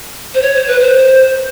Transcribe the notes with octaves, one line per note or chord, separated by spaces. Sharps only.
C5
C#5
C5
B4
C5